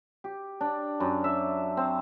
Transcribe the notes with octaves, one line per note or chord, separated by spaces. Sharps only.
G4
D4
F#2
E5
C4